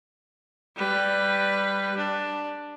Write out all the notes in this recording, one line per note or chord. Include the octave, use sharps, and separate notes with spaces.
G3 B4
D4